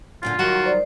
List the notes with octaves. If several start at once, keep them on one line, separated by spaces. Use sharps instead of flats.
F#2 A#2 D3 F4
D#3 F#3 G3 F#4
C5 D5